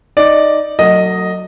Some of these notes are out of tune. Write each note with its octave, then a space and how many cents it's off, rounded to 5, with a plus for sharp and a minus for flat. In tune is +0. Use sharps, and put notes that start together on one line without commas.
D#4 +0 D5 +0
F#3 +0 A3 +40 D#5 +0